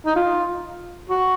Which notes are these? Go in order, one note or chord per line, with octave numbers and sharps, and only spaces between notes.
D#4
F4
F#4